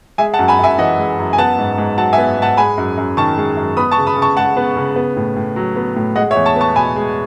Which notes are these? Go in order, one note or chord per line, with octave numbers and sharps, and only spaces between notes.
G#3 E5 G#5
F#5 A5
F#2
G#5 B5
F#2 E5 G#5
E3 D#5 F#5
G#3
F#2
G#5
B3 F#5 A5
G#2
G#2
F#3 F#5 A5
E5 G#5
B3
G#2 F#5 A5
G#3 G#5 B5
F#2
F#2
D#3 A5 C#6
G#3
F#2
B3 B5 D#6
A5 C#6
C#3
B5 D#6
C#3
A5 C#6
G#3 F#5 A5
B3
C#3
B3
A2
A2
F#3
B3
A2
G#3 D#5 F#5
C#5 E5
E2
A5 C#6
B3 A5 C#6
B2 G#5 B5
G#3